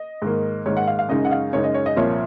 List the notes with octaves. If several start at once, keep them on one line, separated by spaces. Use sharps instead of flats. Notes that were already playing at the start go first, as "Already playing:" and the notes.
Already playing: D#5
G#2 D#3 A#3
G#2 D#3 A#3 C#5
F#5
F5
F5
F#2 C#3 G#3 D#4 D#5
F#5
F5
F#2 C#3 G#3 D#4 C#5
D#5
C#5
D#5
C2 A#2 F3 C#5